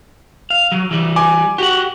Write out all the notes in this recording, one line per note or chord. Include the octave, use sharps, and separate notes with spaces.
F5
F#3
E3 G3
G#5 D6
F#4 G4 F#5